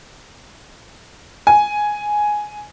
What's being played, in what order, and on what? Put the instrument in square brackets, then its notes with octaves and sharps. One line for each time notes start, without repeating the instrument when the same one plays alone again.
[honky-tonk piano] G#5